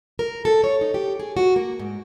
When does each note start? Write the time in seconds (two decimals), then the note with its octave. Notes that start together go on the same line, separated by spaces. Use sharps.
0.19 A#4
0.45 A4
0.64 C#5
0.81 D#4
0.94 G4
1.20 G#4
1.37 F#4
1.56 A#3
1.79 G#2